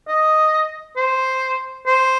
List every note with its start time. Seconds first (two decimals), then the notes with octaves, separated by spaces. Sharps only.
0.08 D#5
0.97 C5
1.86 C5